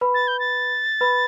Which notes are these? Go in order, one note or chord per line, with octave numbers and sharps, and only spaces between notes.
B4 B5
A6
G6
A6
B4 B5